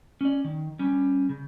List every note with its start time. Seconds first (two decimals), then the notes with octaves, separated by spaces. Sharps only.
0.21 C#4 D5
0.44 D#3
0.79 G3 C#4
1.29 C#3